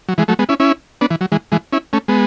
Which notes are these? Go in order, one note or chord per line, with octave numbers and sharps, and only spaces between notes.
F#3
E3 G#3
F#3 A3
G#3 B3
C#4 E4
C#4 E4
B3 D4
E3
F#3
E3 G#3
E3 G#3
C#4 E4
A3 C#4
G#3 B3